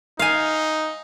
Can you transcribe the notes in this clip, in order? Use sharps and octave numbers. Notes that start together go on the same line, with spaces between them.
D#4 F5 G#5